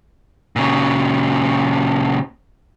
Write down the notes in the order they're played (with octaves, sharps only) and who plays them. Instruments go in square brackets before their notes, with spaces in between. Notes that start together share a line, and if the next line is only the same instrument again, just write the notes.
[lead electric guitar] A#2 C#3